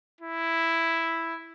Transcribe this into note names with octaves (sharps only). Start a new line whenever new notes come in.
E4